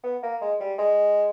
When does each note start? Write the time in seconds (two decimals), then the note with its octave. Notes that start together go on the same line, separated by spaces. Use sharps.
0.03 B3
0.23 A#3
0.41 G#3
0.60 G3
0.78 G#3